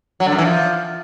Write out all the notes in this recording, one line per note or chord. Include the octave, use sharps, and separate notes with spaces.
F#3
D3
F#2
E3
F3